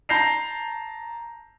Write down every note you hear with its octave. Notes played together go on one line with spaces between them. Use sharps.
A5 A#5 G6 A#6 C7 F7